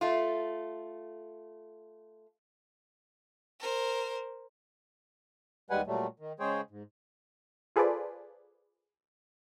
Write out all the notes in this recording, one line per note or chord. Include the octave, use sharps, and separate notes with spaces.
A3 F4
A#4 C5
D#2 G3 G#3 B4 F#5 G#5
A#2 F#3 G3 A3
D#3
C#3 G#3 G#4 C5 C#5 G5
G#2
F4 G#4 A4 B4 C5 D5